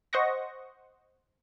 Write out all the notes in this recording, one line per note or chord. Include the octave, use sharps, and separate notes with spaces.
C5 D#5 F#5 C#6 A#6